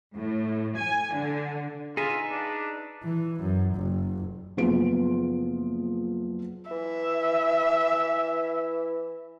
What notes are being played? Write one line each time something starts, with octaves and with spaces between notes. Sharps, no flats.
A2
G#5
D3
D#4 F4 G#4 B4 E5
D4
E3
F#2
F#1
F#1 F3 B3 F4 D7
E3 E5